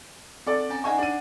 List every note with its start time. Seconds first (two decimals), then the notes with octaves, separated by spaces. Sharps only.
0.47 C4 A4 D5
0.70 C#4 G#5 A#5
0.84 D#4 D5 F#5 G#5 C#6
0.98 D4 D#7